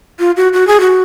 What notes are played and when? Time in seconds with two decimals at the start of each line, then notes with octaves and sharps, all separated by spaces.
0.19 F4
0.37 F#4
0.53 F#4
0.67 G#4
0.80 F#4